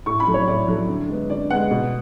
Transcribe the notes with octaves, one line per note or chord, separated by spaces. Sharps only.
A2 C#6
B5
F#3 A3
C#5
A2 D5
F#3 A3
D3
G#3 B3
D3 D5
G#3 B3 F#5
B2